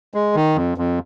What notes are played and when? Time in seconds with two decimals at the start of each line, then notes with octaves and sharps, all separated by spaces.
0.14 G#3
0.35 D#3
0.56 F2
0.78 F2